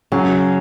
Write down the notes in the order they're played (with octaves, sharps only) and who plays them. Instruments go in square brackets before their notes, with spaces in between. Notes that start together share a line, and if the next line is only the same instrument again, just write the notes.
[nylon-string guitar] C#3 [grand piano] F#3